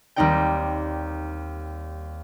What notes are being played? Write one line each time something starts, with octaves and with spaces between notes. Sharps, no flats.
D#2 G3 C4 D#4 D5 G5